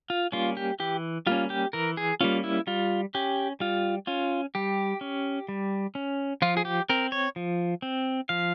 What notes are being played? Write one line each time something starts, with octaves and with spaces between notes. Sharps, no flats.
F4
G3 A#3 C#4 F4
G4
E3 G4
G3 A#3 C#4 F4
G4
E3 A#4
G#4
G3 A#3 C#4 F4
E4
G3 F4
C#4 G4
G3 F4
C#4 F4
G3 G4
C#4
G3
C#4
F3 F4
G#4
G4
C4 A#4
C#5
F3
C4
F3 F5